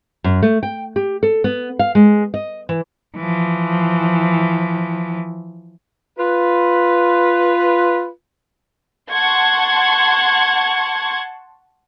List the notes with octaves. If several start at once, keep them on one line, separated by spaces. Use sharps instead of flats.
F#2
A3
G5
G4
A4
B3
F5
G#3
D#5
E3
E3 F3
F4 B4
F#5 A5 C6 C#6 G#6